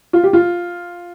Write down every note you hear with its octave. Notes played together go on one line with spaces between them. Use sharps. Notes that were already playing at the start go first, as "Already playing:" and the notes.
F4
G4
F4